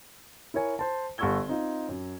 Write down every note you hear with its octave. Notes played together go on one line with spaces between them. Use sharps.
E4 A#4 C#5 G#5
C5 A5
G1 F#5 C#6 E6 G#6 G7
C4 D#4 F4
F#2